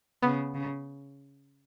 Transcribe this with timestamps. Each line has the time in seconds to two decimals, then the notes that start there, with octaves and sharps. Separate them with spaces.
0.23 C#3 B3
0.54 C#3